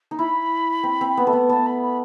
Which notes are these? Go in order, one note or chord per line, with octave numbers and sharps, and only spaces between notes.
D#4
E4 B5
C4
C4
B3
A3
B3
B3 A5
B5
B5